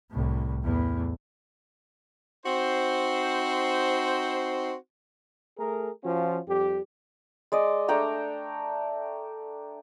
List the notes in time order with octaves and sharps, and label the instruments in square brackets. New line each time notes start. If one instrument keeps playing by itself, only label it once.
[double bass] C2 A2
E2 A2
[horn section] C4 D#4 F#4 C5
[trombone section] A3 G#4 A#4
F3 C#4 F4 F#4
F2 G3 G4
[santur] G#3 D5 D#5
A3 D4 G5 A#5